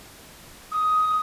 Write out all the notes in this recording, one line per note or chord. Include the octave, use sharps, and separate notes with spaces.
D#6